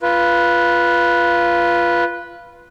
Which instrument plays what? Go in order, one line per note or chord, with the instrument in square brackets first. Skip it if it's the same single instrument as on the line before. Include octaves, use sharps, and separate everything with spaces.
[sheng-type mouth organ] F4 B4